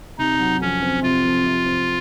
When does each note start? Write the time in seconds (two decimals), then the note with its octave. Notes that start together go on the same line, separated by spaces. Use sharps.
0.18 C3 D#4
0.39 F#3
0.61 F2 C#4
0.82 C4
1.02 C3 F4
1.24 F2
1.46 C3
1.66 C4